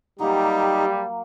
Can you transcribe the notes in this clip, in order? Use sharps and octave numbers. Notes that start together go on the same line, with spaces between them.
F#3 G3 A#3 D#4 G4